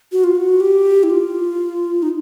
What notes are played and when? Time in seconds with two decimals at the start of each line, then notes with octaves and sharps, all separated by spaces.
0.12 F#4
0.24 F4
0.35 F#4
0.60 G4
1.03 E4
1.10 F4
2.03 D#4